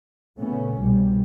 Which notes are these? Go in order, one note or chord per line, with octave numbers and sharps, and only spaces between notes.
A#2 C#3 A3 B3 C#4
C2 G#2 B2 G3